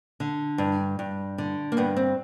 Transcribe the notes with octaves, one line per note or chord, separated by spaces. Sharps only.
D3
G2
G2
D3
A#3
G2 B3
C4